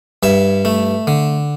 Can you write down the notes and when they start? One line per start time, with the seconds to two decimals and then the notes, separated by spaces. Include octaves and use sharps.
0.23 G2 E5
0.65 A3
1.07 D3